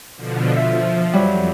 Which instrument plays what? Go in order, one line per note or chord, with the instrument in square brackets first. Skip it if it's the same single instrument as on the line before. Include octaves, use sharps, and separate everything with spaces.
[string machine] B2 D3 F3
[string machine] F3 [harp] E5
[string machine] F2 [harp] F#3 G3